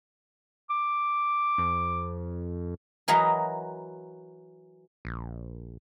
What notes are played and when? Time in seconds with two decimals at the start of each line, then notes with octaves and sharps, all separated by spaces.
0.70 D6
1.58 F2
3.08 E3 F#3 A#4 D#5 A#5
5.05 A#1